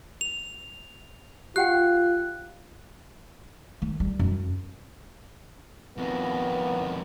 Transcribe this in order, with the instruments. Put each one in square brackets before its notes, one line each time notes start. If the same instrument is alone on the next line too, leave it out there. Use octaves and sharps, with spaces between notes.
[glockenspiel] F7
[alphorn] F4 [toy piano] G4 F#5 G5 [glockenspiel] F#6
[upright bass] D#3
G3
F#2
[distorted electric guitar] F2 D#3 [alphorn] B3